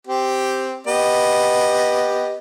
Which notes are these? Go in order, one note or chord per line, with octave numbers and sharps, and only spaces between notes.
C4 G4
B3 G4 D#5